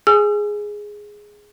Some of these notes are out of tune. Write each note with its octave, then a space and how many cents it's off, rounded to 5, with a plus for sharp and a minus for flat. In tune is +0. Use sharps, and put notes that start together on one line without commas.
G#4 +0 G#5 +0 E6 +45